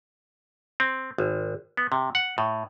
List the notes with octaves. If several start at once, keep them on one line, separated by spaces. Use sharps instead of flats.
C4
G#1
B3
C3
F#5
A2